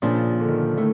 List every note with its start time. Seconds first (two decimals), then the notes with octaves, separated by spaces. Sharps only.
0.02 A#2 C#3 F3 A#3 D4
0.40 D3
0.48 D#3
0.57 D3
0.77 A2 A3